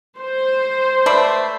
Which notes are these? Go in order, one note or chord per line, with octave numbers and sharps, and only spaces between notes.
C5
A3 B4 D5